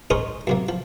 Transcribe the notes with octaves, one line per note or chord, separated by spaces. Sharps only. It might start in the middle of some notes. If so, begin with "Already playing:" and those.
C#4 G#4 A#4 C5 C#5 D#5
F#2 C3 A#3
F3